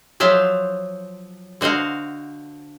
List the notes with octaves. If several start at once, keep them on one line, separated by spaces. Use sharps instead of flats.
F3 F#3 C5 E5 F5
D3 F#4 C5 D#5 F5